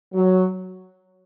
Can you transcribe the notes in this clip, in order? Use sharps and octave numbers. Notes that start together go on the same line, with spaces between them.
F#3